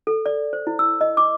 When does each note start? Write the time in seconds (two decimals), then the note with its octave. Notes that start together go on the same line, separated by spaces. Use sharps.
0.07 A4
0.26 D5
0.53 C5
0.67 E4
0.79 E6
1.01 D#5
1.17 D6